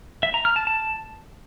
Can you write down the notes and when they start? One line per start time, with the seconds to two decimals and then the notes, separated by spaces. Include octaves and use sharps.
0.23 E5
0.34 A#5
0.45 F6
0.56 A5
0.67 A5